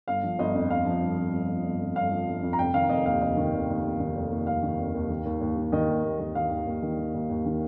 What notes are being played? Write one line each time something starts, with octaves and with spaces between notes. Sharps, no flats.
G1 F5
F3
G1 D#5
F2
G1 F5
F3
G1
F2
G1
F3
G1
F2
G1 F5
F3
G1
F2
A#5
F1 G5
D#3 F5
F1 D#5
D#2 F5
F1 D#5
D#3
F1
D#2
F1
D#3
F1
D#2
F1 F5
D#3
F1
D#2
D#3
D#2
D#2
D#3
D#3 D#5
D#2
D#2
D#3
D#3 F5
D#2
D#2
D#3
D#3
D#2
D#2
D#3